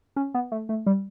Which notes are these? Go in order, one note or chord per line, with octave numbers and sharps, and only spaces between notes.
C#4
B3
A3
A3
G3